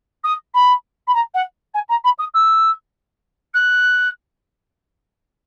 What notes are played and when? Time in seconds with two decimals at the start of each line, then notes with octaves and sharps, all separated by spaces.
0.23 D#6
0.54 B5
1.07 B5
1.14 A#5
1.34 F#5
1.74 G#5
1.89 A#5
2.04 B5
2.18 D#6
2.34 E6
3.54 F#6